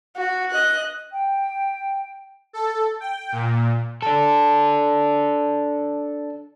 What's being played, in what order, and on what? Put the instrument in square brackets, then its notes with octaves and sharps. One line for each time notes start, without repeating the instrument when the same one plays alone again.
[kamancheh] F#4
D#5 F#6
[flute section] G5
[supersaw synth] A4
G5
A#2
[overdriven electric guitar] D4 A4